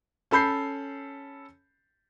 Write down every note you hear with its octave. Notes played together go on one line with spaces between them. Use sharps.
C#4 A4 B5 G6 C7